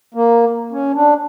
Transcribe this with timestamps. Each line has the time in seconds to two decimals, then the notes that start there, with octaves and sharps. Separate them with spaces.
0.14 A#3
0.72 C#4
0.94 D4